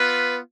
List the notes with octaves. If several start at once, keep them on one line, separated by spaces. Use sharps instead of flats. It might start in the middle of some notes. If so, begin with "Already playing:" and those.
Already playing: B3 F4 B4